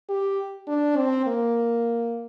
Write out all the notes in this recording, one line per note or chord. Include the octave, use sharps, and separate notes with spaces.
G4
D4
C4
A#3